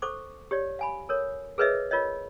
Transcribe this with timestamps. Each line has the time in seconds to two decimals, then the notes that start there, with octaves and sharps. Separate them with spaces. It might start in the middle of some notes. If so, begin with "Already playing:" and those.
0.02 A4 C5 C#6 D6
0.51 G4 C#5 D5
0.79 F5 G#5 B5
1.09 A4 A#4 C#5
1.58 G#4 A#4 B4 C#5 D#5 E5
1.91 F4 A#4 C#5 D#5